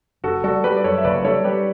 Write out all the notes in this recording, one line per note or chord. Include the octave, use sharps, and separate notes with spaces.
F#1 F#4 A4
G3 F#4 A4
G3 G4 B4
D5
F#2 A4 C#5
E5
F#1 B4 D5
G3 A4 C#5
G3 G4 B4